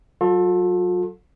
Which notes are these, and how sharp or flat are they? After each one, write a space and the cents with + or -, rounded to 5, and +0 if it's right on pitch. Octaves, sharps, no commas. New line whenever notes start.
F#3 +0 F4 +45 A4 +0